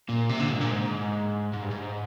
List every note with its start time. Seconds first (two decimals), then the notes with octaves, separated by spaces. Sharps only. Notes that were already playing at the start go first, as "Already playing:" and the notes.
0.09 A#2
0.29 C3
0.40 D3
0.50 G#2
0.61 A#2
0.71 G#2
1.53 G#2
1.62 G2
1.71 G#2